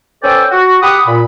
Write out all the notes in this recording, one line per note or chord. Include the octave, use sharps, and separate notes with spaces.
C#4 A4 B4 C5 D5 G5
F#4
G4 F#5 B5 D6 D#6
A#2 B5